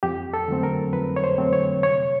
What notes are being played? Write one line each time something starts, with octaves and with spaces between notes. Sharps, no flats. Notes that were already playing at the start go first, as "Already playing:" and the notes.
F2 G4
A4
D3 F#3 A3 C4
A#4
F2 B4
C#5
C5
D3 F#3 A3 C4
C#5
C3 C#5